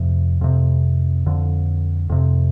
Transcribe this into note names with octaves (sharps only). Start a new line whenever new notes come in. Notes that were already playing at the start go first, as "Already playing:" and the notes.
Already playing: F2 C3 F3
F2 C3
F2 D3
F2 C3